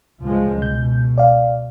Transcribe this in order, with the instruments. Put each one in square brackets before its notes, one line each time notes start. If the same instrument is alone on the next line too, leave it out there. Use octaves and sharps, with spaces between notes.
[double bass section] C#2 F3 G#3
[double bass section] B2 [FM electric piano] G6
[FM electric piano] D5 F5